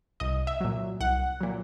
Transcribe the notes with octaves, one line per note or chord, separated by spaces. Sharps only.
C2 D#5
E5
A#2 F#3
C2 F#5
A#2 F#3